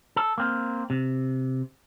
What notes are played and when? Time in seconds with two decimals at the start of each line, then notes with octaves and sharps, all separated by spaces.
0.16 A4
0.38 A#3 C4
0.90 C3